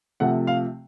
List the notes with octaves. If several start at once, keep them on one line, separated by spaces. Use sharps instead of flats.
C3 F3 A3 F#5
F5